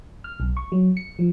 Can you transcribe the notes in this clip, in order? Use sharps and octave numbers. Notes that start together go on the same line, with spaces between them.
F6
B1
C#6
F#3
C#7
F3